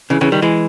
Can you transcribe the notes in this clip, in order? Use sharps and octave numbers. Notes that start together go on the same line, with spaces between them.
C#3 E3
C#3 E3
D#3 G3
E3 G#3